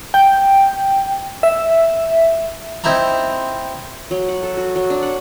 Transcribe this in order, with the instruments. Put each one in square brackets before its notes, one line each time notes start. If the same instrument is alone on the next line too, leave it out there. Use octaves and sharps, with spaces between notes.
[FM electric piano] G5
E5
[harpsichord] C4 D#4 E4 E5 A#5
[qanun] F#3
F#5
A4
F#4
F#3
D4
F#5